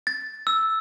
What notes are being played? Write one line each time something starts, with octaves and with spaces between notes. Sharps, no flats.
A6
E6